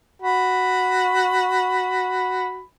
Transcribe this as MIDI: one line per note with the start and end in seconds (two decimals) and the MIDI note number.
0.22 2.62 66
0.22 2.62 83